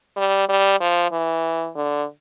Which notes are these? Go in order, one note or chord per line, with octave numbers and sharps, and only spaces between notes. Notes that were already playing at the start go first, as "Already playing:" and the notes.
G3
G3
F3
E3
D3